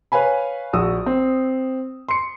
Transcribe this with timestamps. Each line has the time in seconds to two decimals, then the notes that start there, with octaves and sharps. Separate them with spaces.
0.12 B4 C#5 F5 G#5 B5
0.73 A#1 F#4 D#6 E6
1.06 C4
2.09 C6 C#7